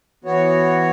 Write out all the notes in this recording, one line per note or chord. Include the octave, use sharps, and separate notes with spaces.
E3 B3 F#4 C#5